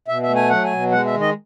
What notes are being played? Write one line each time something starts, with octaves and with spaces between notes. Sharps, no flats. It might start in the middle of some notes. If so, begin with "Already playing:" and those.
B2 E5
E5
A3
G#5
F#3 F#5
G#5
B2
G#3 F#5
E5
D#3
D#5